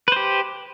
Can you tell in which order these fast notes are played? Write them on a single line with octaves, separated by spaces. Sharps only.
B4 C5 G4